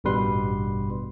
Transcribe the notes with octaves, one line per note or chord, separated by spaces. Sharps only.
A1 G2 B2 G3 B4 C6